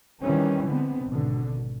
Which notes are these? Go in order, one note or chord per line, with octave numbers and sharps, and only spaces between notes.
D#3 E3 G3 C4 C#4
D3 G#3 B3 C4
G#1 B2 D3